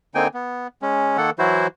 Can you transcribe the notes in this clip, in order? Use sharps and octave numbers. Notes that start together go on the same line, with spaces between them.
D3 A#3 C4 D#4 G5 G#5
B3
G#3 C#4
D#3 A#3 A4 F#5
E3 F#3 E4 F#4 C5